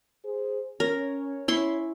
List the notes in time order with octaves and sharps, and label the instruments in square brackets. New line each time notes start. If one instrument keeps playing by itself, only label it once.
[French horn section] G#4 C5
[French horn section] C#4 [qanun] A#4 [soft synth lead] C#5
[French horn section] C#4 [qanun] E4 C6 C#6